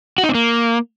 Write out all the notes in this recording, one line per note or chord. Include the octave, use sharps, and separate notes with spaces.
F#4
D#4
C4
A#3